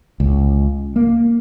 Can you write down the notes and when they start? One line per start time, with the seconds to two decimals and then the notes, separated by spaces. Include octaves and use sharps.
0.20 C#2
0.96 A#3